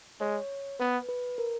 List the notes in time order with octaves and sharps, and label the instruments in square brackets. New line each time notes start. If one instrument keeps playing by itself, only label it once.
[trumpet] G#3 [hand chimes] C#5
[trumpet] B3 [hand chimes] B4
[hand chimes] B4
A#4